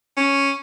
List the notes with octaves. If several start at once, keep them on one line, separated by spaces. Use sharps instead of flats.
C#4